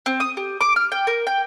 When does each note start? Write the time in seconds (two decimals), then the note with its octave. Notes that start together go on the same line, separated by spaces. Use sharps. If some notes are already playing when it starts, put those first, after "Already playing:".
0.06 C4
0.20 D#6
0.37 G4
0.61 D6
0.76 F6
0.92 G5
1.07 A#4
1.27 G5